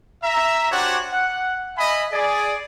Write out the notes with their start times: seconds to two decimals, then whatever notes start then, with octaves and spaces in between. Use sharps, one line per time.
0.24 E5 A#5
0.71 D4 F#4 G4 C5 C#5 F#5
1.13 F#5
1.77 D#5 E5 G#5 B5
2.12 G#4 D5